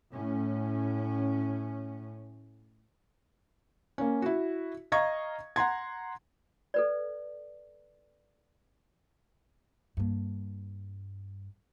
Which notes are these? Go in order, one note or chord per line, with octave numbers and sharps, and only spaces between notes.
A2 C#4
A#3 C#4
E4 F#4
D#5 F5 A#5 C#6 G#6
F#5 A#5 C6 G#6
A4 B4 D5
G2 A#3